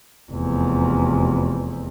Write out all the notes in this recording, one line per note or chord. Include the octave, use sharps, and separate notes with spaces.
F1 E2